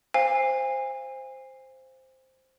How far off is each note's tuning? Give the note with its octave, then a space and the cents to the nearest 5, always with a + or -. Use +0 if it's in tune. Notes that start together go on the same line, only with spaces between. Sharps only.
C5 +0 F5 +0 G#5 -35